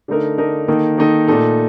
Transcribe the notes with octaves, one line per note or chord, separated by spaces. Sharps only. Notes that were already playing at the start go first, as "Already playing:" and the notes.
D3 A3 D#4 A#4
D3 A3 D#4 A#4
D#3 A#3 D#4 A4
D#3 A#3 D#4 A4
A#2 A3 D#4 A4